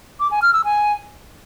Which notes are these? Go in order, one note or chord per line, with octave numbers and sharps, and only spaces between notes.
D6
G#5
F6
E6
G#5